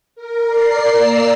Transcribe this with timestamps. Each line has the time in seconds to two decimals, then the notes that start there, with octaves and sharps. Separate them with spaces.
0.16 A#4
0.47 A#4 D5 C7
0.94 A#3 D5 A#5 E6 C7